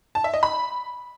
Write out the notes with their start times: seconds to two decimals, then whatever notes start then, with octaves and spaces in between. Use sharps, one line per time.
0.15 A5
0.24 E5
0.34 D#5
0.43 B5